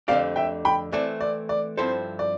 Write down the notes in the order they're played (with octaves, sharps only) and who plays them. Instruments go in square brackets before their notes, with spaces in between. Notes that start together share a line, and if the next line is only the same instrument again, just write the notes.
[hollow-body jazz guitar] F2 D3 A3 C4 G4 [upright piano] D5 F5
[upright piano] E5 G5
G5 B5
[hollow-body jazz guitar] E3 A3 C4 [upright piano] D5
[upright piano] D5
D5
[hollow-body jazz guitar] G2 F3 C4 E4 A4 [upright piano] C5
[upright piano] D5